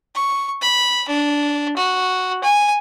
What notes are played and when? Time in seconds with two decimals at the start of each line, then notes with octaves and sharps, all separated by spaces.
0.15 C#6
0.62 B5
1.09 D4
1.77 F#4
2.43 G#5